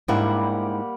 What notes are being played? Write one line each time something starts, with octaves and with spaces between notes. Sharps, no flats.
G#2 G3 A#3 D4 E4 F#5